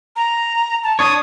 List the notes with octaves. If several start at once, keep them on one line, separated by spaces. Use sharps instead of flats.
A#5
A5
D4 C#5 D#6